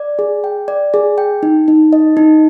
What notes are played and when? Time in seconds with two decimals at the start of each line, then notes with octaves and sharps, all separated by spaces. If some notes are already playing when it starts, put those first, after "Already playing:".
Already playing: D5
0.19 G#4
0.44 G5
0.68 D5
0.94 G#4
1.18 G5
1.43 D#4
1.68 D#4
1.93 D#5
2.17 D#4